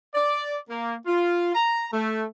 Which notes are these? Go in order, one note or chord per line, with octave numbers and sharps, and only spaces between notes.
D5
A#3
F4
A#5
A3